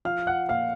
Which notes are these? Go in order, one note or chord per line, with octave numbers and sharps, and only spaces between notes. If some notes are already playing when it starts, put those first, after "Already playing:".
F3 F5 F6
F#5 F#6
A#2 F5 F6